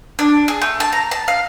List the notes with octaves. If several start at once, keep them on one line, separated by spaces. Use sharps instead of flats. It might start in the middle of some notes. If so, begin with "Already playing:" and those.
D4
G#4
A3
A5
A#5
A5
F5